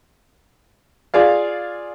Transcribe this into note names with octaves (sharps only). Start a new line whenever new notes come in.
F4 G#4 D5 F5